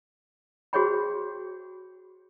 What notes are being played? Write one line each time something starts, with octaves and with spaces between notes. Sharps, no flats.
F#4 G#4 C5 C#5 G5 B5